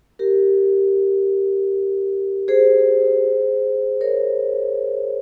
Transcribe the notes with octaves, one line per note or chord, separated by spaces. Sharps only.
G4 A#4
G#4 C5
A#4 C#5